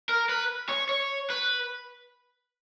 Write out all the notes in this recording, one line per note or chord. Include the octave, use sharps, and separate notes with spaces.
A#4
B4
C#5
C#5
B4